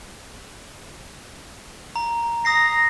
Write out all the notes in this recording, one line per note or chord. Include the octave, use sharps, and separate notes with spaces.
A#5
A#5 D#6 A#6 C7